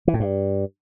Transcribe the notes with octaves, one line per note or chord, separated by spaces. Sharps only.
E3
A2
G2